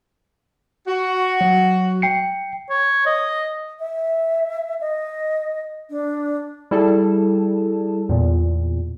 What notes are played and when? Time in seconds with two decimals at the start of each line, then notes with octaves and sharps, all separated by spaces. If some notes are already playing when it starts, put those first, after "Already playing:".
0.87 F#4
1.41 F#3
2.02 G5 C7 C#7
2.70 C#5
3.06 D#5
3.80 E5
4.81 D#5
5.90 D4
6.71 G3 E4 G#4 A4 A5
8.09 E2 A#2